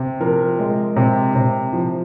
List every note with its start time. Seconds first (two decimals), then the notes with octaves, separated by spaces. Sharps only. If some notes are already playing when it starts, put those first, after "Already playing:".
Already playing: C3
0.20 F3 A#4
0.59 G#3
0.96 C3
1.35 C3
1.73 F3